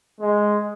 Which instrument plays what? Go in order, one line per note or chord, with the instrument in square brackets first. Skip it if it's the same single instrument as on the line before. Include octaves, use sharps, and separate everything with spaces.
[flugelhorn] G#3